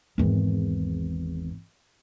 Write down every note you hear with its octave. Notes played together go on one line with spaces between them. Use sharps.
G#1 E2